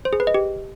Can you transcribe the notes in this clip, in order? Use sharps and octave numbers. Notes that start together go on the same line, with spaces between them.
C5
G#4
B4
D#5
G4